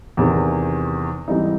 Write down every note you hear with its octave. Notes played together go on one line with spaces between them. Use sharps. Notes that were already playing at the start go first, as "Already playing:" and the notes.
E2 C3 D#3
G#2 E3 G3 C4 D#4